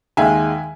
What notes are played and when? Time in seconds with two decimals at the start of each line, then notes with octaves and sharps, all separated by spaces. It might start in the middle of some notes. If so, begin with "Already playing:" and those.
0.17 D#2 D#3 G#3 E5 G#5